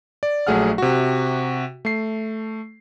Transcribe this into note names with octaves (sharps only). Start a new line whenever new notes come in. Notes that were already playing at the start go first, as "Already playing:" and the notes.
D5
A#1 F#3 A3 G#4 F#5 F6
C3 F#4
A3 C7